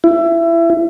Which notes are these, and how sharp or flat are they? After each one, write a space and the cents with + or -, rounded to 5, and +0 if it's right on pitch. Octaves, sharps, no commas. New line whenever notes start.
E4 +25